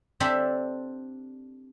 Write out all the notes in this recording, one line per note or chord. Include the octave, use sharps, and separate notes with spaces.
C4 D4 G4 A4 C5 E5